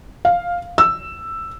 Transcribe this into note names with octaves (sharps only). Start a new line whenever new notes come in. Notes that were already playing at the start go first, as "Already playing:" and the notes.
F5
E6